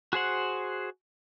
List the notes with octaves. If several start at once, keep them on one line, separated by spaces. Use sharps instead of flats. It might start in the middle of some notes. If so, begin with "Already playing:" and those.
F#4 G#4 C5 F#5